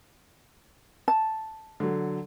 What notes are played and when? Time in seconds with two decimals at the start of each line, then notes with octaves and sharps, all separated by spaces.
1.08 A5
1.80 D3 F#3